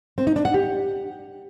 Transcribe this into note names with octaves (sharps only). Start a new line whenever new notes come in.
C4
D#4
D4
F#5
G4